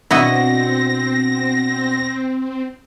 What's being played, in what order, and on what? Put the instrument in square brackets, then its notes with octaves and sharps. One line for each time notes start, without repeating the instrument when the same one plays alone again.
[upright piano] B2 D4 F#5 [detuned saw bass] C4 [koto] E4 F#4 D#5 [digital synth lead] A#6